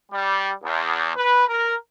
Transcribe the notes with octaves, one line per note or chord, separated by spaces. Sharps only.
G3
E2
B4
A#4